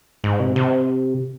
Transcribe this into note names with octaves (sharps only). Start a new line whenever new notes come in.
G#2
C3
C3